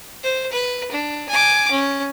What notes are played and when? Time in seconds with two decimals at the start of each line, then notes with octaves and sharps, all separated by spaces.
0.23 C5
0.52 B4
0.91 D4
1.29 G#5 D6
1.71 C#4